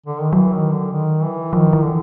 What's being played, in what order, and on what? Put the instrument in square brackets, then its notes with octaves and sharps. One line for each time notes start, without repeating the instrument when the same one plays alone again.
[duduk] D3
D#3
[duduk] E3 [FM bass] F#3
[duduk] D#3
D3
D#3
E3
[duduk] D#3 [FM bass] F3
[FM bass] E3
[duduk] D3